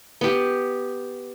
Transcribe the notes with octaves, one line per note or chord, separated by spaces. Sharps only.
B3 G4